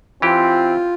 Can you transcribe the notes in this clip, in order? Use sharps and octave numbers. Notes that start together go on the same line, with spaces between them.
E3 C4 F4 G4